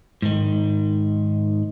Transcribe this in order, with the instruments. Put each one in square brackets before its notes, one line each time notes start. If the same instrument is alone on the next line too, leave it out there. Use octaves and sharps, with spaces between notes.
[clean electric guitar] G#2 D#3